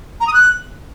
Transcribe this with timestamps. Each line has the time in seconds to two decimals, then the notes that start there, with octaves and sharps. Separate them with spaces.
0.21 A#5
0.27 D#6
0.34 F#6